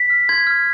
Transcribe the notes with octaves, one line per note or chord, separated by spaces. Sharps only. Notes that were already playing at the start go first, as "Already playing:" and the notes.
Already playing: B6
F6
C6 G#6
F6